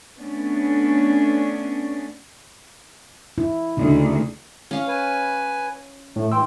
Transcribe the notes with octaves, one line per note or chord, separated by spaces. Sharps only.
A3 B3 C#4 D4
E4
D2 C#3 D#4
C#4 F5
B4 G#5
A2 A3
G#2 E3 G5 C6 E6